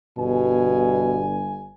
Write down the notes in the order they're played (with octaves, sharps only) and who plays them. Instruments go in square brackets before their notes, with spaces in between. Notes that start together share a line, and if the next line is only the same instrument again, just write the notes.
[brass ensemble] G1 G2 G#5 [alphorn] B2